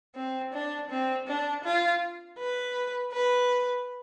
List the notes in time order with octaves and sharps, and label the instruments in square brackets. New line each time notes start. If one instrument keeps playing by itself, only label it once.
[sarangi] C4
D4
C4
D4
F4
B4
B4